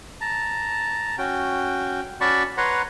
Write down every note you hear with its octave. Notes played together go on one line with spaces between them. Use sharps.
A5 A#5
C#4 F#4 G5
C#4 F#4 D5 A5 B5 C#6
B4 C#5 F#5 A#5 C6